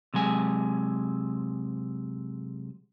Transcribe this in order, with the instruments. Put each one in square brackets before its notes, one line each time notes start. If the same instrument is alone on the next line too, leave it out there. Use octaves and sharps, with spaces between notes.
[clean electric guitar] C3 F#3 G#3 G#5